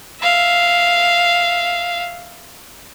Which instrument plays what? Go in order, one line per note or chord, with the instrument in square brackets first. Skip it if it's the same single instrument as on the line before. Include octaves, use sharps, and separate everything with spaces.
[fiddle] E5 F5